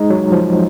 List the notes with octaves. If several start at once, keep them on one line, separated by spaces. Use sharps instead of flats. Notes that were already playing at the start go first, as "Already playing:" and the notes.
Already playing: G#3 D#4
F#3
F3